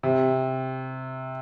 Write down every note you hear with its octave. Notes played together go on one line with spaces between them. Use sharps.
C3